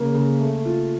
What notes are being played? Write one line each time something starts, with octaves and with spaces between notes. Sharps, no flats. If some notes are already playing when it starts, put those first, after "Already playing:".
Already playing: C#3 A#3
C#3
A3
F4